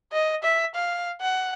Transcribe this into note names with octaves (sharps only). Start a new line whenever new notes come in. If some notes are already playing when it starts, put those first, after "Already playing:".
D#5
E5
F5
F#5